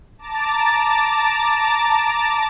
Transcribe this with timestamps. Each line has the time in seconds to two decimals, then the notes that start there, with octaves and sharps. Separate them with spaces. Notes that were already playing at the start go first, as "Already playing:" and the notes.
0.18 A5 A#5 D6 A6